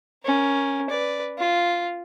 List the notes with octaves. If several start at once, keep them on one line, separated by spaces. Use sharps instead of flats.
C#4 A#4
B4 D5
F4